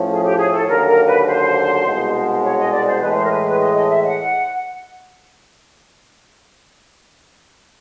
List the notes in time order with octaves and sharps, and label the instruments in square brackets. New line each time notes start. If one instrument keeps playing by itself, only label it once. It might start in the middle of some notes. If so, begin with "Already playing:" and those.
Already playing: [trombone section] A2 F3 A3 C#4
[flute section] G#4
G4
G#4
A4
[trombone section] D#2 D3 F#3 [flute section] A#4
[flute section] A#4
B4
C5
[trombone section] C2 B2 G#3
[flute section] C#5
D#5
D5
C5
[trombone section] A2 E3 G#3 [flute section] B4
[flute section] C5
A#4
B4
B4
D#5
D#5
E5
F#5